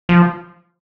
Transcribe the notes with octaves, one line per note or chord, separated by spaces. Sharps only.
F3